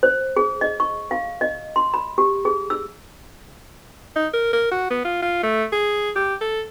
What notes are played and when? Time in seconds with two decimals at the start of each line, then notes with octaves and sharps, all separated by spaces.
0.03 C5
0.37 G#4
0.61 D#5
0.80 C#6
1.11 F5
1.41 D#5
1.76 C6
1.94 B5
2.18 G4
2.45 G#4
2.70 E6
4.16 D#4
4.33 A#4
4.53 A#4
4.72 F#4
4.90 B3
5.05 F4
5.22 F4
5.43 A3
5.72 G#4
6.16 G4
6.41 A4